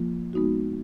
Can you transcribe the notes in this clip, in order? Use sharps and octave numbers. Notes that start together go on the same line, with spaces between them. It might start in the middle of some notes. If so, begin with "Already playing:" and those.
Already playing: F3 A#3 F4
G#3 B3 D#4 F#4